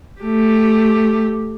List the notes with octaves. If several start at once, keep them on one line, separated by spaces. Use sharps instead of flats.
A3 G4